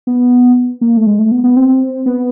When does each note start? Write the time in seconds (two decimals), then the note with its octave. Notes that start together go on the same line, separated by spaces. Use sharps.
0.07 B3
0.81 A#3
0.97 A3
1.06 G#3
1.19 A3
1.32 B3
1.44 B3
1.56 C4
2.06 B3